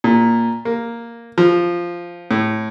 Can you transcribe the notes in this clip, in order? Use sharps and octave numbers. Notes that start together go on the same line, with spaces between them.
A#2
A#3
F3
A2